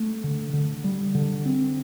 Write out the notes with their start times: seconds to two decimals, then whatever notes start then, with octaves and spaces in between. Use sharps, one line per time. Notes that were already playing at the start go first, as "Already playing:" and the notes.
Already playing: A3
0.24 D3
0.53 D3
0.84 G3
1.15 D3
1.46 C4